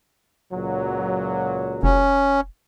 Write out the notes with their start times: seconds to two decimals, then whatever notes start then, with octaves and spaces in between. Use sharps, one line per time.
0.53 C#2 A#2 F#3
1.83 F1 C#4